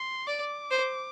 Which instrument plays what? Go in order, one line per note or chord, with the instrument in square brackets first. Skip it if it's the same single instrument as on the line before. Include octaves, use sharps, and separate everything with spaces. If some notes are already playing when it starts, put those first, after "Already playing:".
Already playing: [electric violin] C6
[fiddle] D5 [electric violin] D6
[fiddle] C5